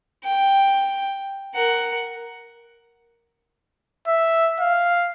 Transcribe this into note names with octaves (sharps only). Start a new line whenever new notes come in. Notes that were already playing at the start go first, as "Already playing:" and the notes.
G5
A#4 F#5
E5
F5